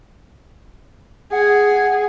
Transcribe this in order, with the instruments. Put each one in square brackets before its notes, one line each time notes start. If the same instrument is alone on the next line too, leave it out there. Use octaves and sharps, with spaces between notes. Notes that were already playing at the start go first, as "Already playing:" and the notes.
[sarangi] G#4 [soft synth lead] F#5